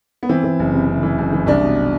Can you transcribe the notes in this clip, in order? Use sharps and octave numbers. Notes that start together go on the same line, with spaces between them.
B3
E3 C4
E3
F#1
C3
C3
E3
F#1
E3
C2 D4
B2